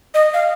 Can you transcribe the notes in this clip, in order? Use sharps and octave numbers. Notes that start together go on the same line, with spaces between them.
D#5
F5